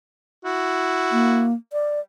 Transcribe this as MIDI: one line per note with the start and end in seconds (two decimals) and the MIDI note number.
0.45 1.47 64
0.45 1.47 66
1.12 1.53 58
1.73 2.00 74